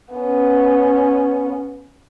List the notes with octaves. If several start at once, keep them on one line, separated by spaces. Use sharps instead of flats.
B3 C#4